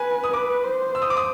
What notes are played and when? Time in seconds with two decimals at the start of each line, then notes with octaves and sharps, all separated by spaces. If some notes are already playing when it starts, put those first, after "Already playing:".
Already playing: B4 G#5
0.24 D#6
0.33 B4 D6
0.64 C5
0.95 E6
1.02 D#6
1.10 D6
1.17 D#6